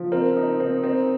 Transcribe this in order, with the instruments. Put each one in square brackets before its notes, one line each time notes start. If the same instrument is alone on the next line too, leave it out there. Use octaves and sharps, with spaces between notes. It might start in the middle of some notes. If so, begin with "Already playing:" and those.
Already playing: [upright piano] F3
[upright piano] C4 [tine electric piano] A#4
[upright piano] D#4
C4
C4